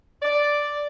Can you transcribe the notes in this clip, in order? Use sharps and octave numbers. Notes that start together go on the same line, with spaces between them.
D5